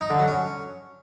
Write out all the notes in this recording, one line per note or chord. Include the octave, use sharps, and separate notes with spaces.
D#4
D3
F#3
C#4